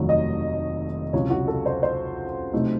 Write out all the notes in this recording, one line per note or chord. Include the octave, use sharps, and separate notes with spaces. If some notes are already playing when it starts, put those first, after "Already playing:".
Already playing: F1 D#2 D#3 F#3 A3
D#5
C#2 C3 F#3 C#5
F#4
A4
C5
C5
C3 F#3 A3 D#4